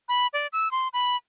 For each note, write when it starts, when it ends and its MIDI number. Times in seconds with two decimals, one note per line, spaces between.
0.09 0.27 83
0.33 0.47 74
0.53 0.71 88
0.71 0.88 84
0.93 1.16 83